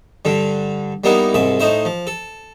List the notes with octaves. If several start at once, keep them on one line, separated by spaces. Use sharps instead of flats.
G2 D3 G3
G3 A#3 B3 D#4 E4
C2 G#2 E5
A2 D#4 C5 E5
F3
A4